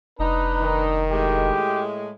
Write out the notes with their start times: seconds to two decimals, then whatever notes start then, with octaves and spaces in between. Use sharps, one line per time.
0.19 F1 D4 D#4 B4
0.61 D#3
1.11 A2 G#3 G4